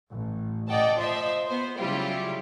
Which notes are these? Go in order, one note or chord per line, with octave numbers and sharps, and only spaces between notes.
A1
D5 D#5 F#5 G5 A5
F3 C5 D#5 E5
B3 C5
C#3 F#3 G3 E4 F4 G4